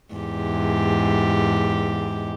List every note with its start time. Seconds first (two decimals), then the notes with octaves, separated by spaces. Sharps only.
0.14 E2 G#2 G4